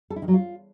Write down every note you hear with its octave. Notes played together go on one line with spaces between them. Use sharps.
A4
E4
D#3
F#3
F4